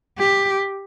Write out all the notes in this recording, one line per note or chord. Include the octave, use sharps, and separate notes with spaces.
G4